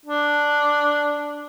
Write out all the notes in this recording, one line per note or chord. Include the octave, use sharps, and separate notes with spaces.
D4